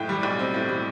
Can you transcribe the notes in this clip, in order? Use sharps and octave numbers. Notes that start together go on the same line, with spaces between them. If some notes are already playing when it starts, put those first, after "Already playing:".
Already playing: F#1 A2 G5
G3
B1
C4
A2
G3